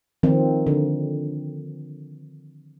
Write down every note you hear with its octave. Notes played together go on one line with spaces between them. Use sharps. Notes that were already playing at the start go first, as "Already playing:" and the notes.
D#3 F3 C4
D3